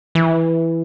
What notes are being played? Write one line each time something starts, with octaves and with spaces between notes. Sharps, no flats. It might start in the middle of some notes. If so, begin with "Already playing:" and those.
E3